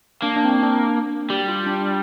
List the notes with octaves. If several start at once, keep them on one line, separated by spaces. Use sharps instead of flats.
A#3 D4
D4
C4
D4
D4
G3 G4
F4
D4